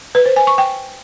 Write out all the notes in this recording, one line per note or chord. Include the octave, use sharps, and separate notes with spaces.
B4
C5
G#5
C#6
G5